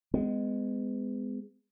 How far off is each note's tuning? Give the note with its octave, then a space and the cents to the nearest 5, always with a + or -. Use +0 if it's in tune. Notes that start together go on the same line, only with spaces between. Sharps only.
G#3 -10 B3 +35